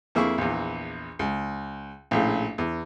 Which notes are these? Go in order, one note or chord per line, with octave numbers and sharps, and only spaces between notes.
F2 A#3 E4 G#4 C#6
A#1 E2
C#2
A#1 A2 C#3
E2